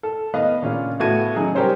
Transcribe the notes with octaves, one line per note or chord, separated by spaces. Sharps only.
A4
B3 B4 D#5 F5
A#2 C#3 C#4 D4 F4
A2 B3 F#4 A4 G#6 D#7
C#3 F#3 D#4 G#4
G3 G4 A#4 C5 C#5